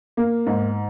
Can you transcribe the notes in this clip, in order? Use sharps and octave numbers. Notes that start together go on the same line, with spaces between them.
A#3
G#2